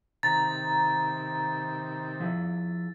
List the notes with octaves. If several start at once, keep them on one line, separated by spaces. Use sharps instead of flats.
C3 D#3 A#5 A6
F3 E4 G#4